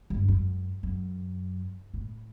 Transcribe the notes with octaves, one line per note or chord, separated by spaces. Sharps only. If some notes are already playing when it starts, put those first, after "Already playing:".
G2
F#2
F#2
A2